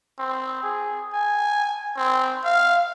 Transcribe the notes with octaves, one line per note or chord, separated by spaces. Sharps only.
C4
G#4
G#5
C4
F5